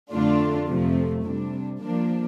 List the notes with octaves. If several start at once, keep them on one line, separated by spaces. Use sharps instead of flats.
F2 D3 A3 D4 F4
F2 C3 F3 A3
C3 G3 D4
F3 A#3 D4